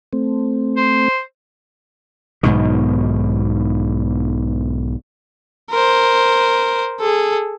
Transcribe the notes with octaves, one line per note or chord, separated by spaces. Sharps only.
A3 C4
C5
B1 G#2 B2 D#3
A#4 C5
G#4 A4